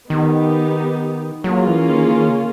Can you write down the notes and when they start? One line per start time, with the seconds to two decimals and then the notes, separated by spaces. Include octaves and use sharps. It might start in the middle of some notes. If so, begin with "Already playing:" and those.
0.10 D#3 B3 D#4 G4
1.44 F#3 A#3 C#4 F4 G#4
1.67 E3
1.90 D#3
2.04 E3
2.12 D#3
2.29 C#3